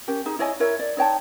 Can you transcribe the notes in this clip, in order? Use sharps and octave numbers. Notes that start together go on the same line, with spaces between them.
C#4 G4 A#4
D#4 G#4
E4 C#5 D#5 G#5
E4 A#4 C#5 E5
D5
D#4 C#5 G5 A5